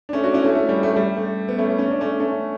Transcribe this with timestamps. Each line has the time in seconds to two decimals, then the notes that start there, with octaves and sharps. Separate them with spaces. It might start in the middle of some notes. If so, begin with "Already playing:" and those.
0.09 D4
0.13 A3 C#4
0.24 D4 F#4
0.34 C#4 E4
0.45 A3 C#4
0.55 A3
0.69 G3
0.83 A3
0.96 G3
1.17 A3
1.48 B3
1.58 A3 C#4
1.78 C#4
1.90 D4
2.01 A3 C#4
2.20 A3 C#4